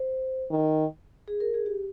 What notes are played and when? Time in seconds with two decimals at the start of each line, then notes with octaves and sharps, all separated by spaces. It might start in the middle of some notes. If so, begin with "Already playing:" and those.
Already playing: C5
0.51 D#3
1.28 G#4
1.40 A#4
1.54 G#4
1.66 G4